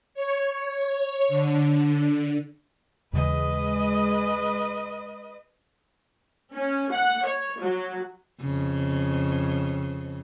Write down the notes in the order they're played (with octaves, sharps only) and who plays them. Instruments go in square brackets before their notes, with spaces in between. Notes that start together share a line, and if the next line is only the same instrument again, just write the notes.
[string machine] C#5
D3
[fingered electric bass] D#2 C#3 E3 [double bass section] G#3 [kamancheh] B4 D#5
[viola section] C#4
F#5
C#5
F#3
[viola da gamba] F2 C#3